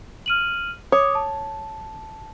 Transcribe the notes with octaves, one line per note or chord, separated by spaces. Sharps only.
F6 D#7 F#7
C#5 D6 D#6
A5